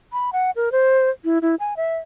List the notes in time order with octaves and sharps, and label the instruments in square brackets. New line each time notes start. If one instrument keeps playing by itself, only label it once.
[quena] B5
F#5
A#4
C5
E4
E4
G#5
E5